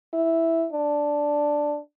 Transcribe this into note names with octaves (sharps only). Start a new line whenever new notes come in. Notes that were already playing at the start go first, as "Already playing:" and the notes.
E4
D4